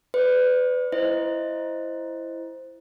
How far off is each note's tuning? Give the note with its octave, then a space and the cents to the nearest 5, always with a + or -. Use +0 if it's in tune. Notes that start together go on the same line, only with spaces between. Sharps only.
B4 +30 D5 +0
E4 +15 C5 +0 D#5 +0